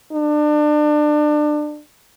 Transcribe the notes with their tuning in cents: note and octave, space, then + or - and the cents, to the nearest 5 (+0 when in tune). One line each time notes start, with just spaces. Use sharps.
D4 +30